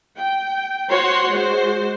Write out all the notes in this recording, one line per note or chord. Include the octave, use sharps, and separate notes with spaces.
G5
F#4 C5 C#5 F#5 C6
G#3 F#4 C5